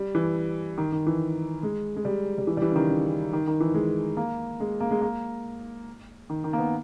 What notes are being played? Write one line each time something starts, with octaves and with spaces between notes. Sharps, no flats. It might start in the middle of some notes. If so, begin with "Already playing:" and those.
Already playing: G3
E3
D#3
D#3
E3
G#3
G#3
G3
G3
E3
G3
E3
C#3
D#3
C#3
D#3
D#3
E3
G#3
A#3
G#3
A#3
G#3
A#3
D#3
D#3
A#3
B3